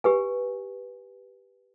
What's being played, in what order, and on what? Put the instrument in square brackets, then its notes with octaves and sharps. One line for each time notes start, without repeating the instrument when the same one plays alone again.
[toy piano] G4 B4 G#5